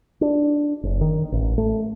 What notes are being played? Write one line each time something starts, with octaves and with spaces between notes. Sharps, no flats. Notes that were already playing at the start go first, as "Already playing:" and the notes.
D4
F#1
D#3
A1
A3